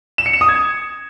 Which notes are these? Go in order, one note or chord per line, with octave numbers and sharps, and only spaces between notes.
E7
C#7
E7
D#6
G#6